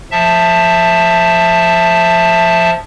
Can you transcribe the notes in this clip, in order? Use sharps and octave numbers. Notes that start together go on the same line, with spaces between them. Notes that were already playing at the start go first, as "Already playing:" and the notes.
F3 E5 A5